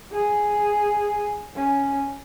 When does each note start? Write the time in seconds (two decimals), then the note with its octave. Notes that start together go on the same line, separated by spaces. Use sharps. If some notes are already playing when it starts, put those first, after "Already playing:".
0.13 G#4
1.56 C#4